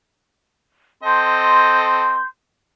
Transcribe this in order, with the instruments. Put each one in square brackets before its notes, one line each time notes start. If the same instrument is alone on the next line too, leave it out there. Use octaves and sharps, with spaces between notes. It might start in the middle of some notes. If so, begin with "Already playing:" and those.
[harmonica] C4 A4 D#5 [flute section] C6 G6